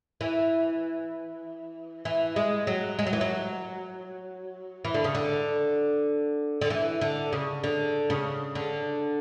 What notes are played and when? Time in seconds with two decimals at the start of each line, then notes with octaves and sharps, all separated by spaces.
0.21 E3
2.05 E3
2.36 G#3
2.67 F#3
2.99 G#3
3.07 F#3
3.13 E3
3.21 F#3
4.85 E3
4.94 D3
5.04 C#3
5.15 D3
6.61 D3
6.70 E3
7.01 D3
7.33 C#3
7.64 D3
8.10 C#3
8.55 D3